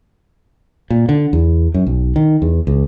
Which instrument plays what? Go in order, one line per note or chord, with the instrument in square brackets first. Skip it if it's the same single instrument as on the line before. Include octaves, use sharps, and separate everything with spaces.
[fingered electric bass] A#2
D3
E2
F#2
B1
D#3
E2
C#2